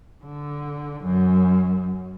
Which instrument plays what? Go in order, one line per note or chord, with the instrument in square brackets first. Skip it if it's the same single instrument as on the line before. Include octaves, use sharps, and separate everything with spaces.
[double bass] D3
F#2